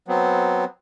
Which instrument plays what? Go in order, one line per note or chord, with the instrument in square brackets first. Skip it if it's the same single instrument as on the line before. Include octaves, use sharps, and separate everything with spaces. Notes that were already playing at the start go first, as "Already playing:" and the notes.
[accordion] F#3 B3 C4